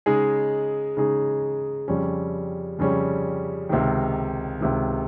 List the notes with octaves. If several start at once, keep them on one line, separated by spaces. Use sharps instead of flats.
C#3 G#3 D#4 G#4
C#3 G#3 D#4 G#4
F2 C#3 G3 C#4
F2 C#3 G3 C#4
C#2 C3 D#3
C#2 C3 D#3